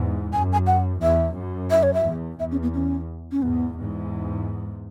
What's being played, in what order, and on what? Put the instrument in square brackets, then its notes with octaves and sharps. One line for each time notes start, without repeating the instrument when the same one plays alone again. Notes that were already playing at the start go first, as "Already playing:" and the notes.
Already playing: [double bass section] E2 G#2
[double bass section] F#2 [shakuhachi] G#5
[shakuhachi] G#5
F#5
[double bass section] E2 [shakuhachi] E5
[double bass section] F#2
[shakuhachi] E5
C#5
E5
[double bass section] E2
[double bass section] E2 [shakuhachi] E5
[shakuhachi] C#4
B3
C#4
C#4
[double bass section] E2 G#2 [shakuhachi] B3
[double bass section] E2 G#2